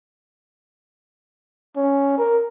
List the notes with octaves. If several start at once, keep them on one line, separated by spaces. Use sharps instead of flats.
C#4
A#4